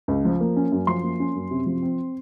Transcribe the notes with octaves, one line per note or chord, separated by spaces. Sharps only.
C#2
F3
A#3
C#4
F#2
F3 C6
A#3
C#4
F#2
C3
F3
C4